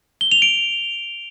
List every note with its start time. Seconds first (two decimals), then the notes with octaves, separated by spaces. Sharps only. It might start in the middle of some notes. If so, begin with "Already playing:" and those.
0.21 G7
0.32 F7
0.42 D7